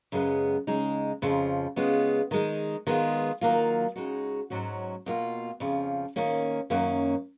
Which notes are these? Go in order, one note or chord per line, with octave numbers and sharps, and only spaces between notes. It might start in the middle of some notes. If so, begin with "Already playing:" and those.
F#2 C#3 G#3 B3
C#3 G#3 D#4
F2 C#3 F3
C#3 G#3 B3 F4
D#3 G#3 D#4
D#3 G#3 B3 F4
D#3 F#3 A#3 F4
C#3 G#3 D#4 F#4
G#2 F#3 C#4 F#4
B2 A#3 F4
F2 C#3 F3
D#3 A#3 C#4
F#2 D#3 A#3 C#4